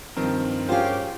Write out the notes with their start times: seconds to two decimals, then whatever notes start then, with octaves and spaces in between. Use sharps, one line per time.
0.17 G2 D#3 F3 C4 A#4
0.69 C#4 F4 G4 G#4 C5 F5